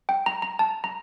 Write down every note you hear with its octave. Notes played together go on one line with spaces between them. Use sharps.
G5
A#5
A#5
A5
A#5